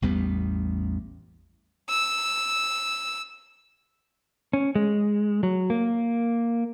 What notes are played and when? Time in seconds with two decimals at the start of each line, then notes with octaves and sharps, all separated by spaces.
0.02 A1 E2 G3 B3
1.89 E6
4.53 C#4
4.75 G#3
5.43 F#3
5.70 A#3